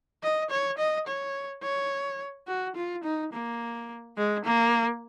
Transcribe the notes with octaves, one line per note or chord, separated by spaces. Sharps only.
D#5
C#5
D#5
C#5
C#5
F#4
F4
D#4
A#3
G#3
A#3